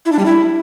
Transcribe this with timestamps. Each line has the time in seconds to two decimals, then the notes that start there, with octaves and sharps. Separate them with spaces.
0.06 E4
0.12 D4
0.19 G3
0.26 E4